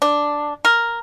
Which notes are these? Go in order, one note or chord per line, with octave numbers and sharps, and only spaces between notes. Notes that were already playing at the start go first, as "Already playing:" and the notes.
D4
A#4